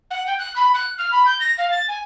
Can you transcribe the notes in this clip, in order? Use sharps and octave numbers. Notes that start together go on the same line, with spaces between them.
F#5
G5
F#6
B5
F#6
F6
B5
G6
A#6
F5
A6
G#5